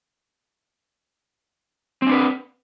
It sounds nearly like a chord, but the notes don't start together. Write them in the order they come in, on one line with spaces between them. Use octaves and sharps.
C4 D4 B4